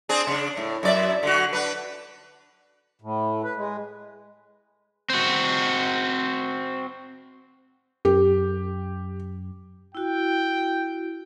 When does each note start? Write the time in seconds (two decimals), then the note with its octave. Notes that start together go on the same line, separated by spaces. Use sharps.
0.09 C4 D4 G#4
0.27 C#3 D4
0.57 A2
0.83 F#2 D5 E5
1.23 D3 F#4
1.53 D4 B4
3.02 A2
3.44 B4
3.57 G#3
5.10 C4 F#4
8.05 F#2 G4
9.95 E4 F#4 G5